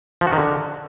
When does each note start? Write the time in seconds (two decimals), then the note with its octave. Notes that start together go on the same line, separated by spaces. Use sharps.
0.21 F3
0.27 F#4
0.33 D#3
0.38 D3